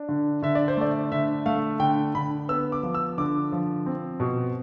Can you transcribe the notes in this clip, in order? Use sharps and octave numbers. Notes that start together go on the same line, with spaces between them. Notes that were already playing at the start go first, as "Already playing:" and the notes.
Already playing: D4
D3
D3 E5
D5
C5
A3 D5
D3 E5
A3 F5
D3 G5
D3 B5
B3 E6
D6
F3
E6
D3 D6
F3
C4
B2